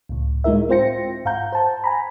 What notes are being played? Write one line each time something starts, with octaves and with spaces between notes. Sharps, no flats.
C#2 A2
A2 G#3 D#4 E4 A#4 E5
C4 F4 C5 G5 A#6 C#7
G#2 F5 F#5 A#5 G6
C5 A5
G#5 A#5 B5